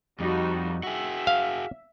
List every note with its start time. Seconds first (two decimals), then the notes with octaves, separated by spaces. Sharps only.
0.20 F2 G3 D#4 F#4
0.83 F#4 G#4 E5
1.27 F5